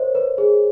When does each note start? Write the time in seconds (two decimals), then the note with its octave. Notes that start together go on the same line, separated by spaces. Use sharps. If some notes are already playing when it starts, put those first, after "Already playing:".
Already playing: A#4 C5 C#5 D#5
0.15 B4
0.38 G#4